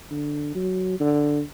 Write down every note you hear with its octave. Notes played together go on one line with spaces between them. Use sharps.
D3
F#3
D3